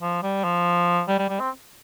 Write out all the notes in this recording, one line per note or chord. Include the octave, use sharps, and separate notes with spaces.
F3
G3
F3
G3
G3
G3
C4